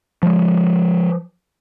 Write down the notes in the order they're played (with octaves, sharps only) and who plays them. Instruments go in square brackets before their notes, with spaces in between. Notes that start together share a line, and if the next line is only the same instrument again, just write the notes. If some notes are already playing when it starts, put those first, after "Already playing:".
[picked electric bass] F3 G#3